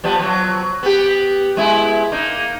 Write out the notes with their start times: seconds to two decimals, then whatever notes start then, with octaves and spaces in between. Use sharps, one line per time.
0.04 F3 G3 B3
0.19 F3 F#3
0.83 B3 G4
1.57 G#3 B3 E4
2.12 A#3 D#4